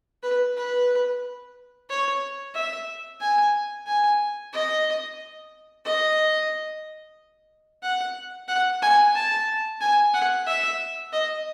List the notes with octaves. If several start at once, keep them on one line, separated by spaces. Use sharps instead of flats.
B4
B4
C#5
E5
G#5
G#5
D#5
D#5
F#5
F#5
G#5
A5
G#5
F#5
E5
D#5